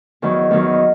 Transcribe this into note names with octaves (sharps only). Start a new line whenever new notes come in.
E2 D#3 F#3 E4
E2 D#3 F#3